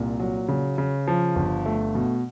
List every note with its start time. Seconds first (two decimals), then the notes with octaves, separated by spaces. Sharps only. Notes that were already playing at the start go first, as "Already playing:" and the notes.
Already playing: C2 A#2
0.20 F#3
0.48 C#3
0.78 C#3
1.07 F3
1.36 G1
1.66 A3
1.95 B2